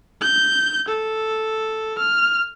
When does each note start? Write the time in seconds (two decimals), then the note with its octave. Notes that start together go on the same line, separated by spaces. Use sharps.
0.22 G6
0.88 A4
1.99 F6